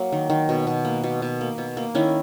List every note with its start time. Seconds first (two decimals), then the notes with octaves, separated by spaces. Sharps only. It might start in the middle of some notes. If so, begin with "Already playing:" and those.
Already playing: F#3 A#3
0.12 D#3
0.30 D#3
0.49 B2
0.67 B2
0.85 A#3
1.04 B2
1.22 B2
1.41 A#3
1.58 B2
1.77 A#3
1.95 D#3 C#4 E4